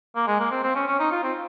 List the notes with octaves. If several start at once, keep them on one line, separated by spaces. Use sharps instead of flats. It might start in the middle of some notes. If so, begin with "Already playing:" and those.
A#3
G#3
A#3
C4
C4
C#4
C#4
D#4
F4
C4